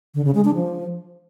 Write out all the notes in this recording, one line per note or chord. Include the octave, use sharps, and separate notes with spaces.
D3
C#3
G#3
D4
F3